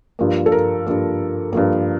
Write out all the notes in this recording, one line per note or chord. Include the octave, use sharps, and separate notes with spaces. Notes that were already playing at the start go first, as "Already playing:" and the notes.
G2 F3 A#3
A4
A#4
G2 F3 A#3
G2 F3 A#3